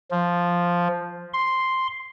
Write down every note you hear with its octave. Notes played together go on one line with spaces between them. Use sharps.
F3
C6